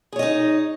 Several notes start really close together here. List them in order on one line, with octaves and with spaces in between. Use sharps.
G#4 C#5 D#5 D#4